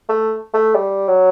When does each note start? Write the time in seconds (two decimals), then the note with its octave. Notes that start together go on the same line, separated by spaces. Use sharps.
0.09 A3
0.54 A3
0.75 G3
1.08 F#3